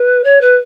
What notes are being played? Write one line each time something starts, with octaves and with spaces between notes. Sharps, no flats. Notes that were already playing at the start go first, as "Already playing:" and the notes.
Already playing: B4
C#5
B4